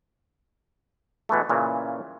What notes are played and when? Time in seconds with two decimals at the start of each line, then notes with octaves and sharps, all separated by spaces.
1.29 B2 E3 G#3 A3
1.49 A#2 C#3 E3